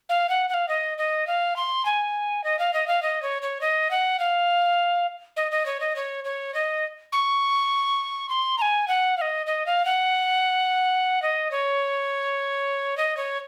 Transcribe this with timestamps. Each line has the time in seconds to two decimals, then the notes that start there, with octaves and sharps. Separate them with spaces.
0.09 F5
0.29 F#5
0.49 F#5
0.54 F5
0.68 D#5
0.98 D#5
1.27 F5
1.56 C6
1.85 G#5
2.44 D#5
2.59 F5
2.73 D#5
2.87 F5
3.03 D#5
3.22 C#5
3.42 C#5
3.61 D#5
3.91 F#5
4.20 F5
5.37 D#5
5.51 D#5
5.66 C#5
5.80 D#5
5.96 C#5
6.25 C#5
6.54 D#5
7.12 C#6
8.29 C6
8.58 A#5
8.62 G#5
8.88 F#5
9.17 F5
9.21 D#5
9.47 D#5
9.66 F5
9.85 F#5
11.22 D#5
11.51 C#5
12.97 D#5
13.17 C#5